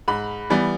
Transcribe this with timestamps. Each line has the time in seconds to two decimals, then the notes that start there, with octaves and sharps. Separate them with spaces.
0.08 G#2 B5
0.50 E3 G3 B3